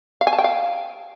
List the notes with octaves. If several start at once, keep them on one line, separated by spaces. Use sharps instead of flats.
F5
G#5
A5
G5
F5